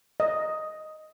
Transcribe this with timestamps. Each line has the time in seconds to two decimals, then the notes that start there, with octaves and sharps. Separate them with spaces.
0.20 D#5